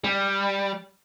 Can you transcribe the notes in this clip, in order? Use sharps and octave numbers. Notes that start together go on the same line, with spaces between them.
G3